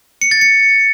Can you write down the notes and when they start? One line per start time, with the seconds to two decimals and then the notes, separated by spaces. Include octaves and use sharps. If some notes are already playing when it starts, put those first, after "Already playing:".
0.22 C#7
0.31 A6
0.41 C#7